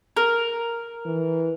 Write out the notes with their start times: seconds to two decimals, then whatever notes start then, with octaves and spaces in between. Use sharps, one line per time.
0.17 A#4
1.06 E3